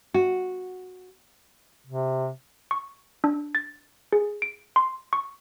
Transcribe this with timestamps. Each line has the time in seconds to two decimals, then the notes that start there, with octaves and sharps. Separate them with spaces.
0.14 F#4
1.86 C3
2.71 C#6
3.24 D4
3.55 A6
4.13 G#4
4.42 D7
4.76 C6
5.13 C#6